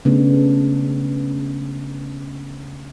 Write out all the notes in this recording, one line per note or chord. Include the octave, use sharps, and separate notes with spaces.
C#3 A3 B3 D4